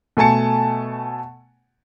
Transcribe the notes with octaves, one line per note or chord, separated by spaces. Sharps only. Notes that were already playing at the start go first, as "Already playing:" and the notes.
B2 A3 G#5 A5 C#7